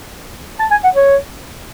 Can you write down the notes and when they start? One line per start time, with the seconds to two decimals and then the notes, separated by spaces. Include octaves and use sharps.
0.60 A5
0.71 G#5
0.84 F#5
0.95 C#5